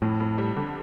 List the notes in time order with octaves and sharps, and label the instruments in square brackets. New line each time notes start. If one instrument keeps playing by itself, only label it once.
[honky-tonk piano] F2 [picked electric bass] A2
[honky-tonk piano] F2
G3
D3